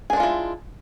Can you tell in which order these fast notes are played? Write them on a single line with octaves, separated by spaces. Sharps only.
G#4 D4 G#3 F4 E4